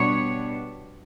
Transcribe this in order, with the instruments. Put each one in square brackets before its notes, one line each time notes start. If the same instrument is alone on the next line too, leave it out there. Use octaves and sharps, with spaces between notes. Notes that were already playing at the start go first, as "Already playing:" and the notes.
Already playing: [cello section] B2 G3 B3 D4 C#5